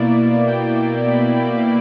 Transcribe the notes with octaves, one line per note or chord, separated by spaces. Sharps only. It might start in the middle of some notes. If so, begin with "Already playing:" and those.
Already playing: B2 A#3 E4 D5
G5
B5
B5